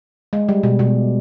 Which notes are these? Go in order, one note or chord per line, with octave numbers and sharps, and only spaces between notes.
G#3
G3
B2
B2